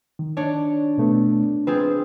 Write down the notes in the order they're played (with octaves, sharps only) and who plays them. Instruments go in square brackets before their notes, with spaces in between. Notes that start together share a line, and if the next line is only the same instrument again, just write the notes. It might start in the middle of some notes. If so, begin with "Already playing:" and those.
[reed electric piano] D#3
[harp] D4 C#5
[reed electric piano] B2 A3 B3
[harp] C4 F4 G#4 [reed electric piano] B4